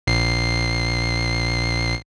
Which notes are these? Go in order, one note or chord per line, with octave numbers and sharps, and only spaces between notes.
A#1 C7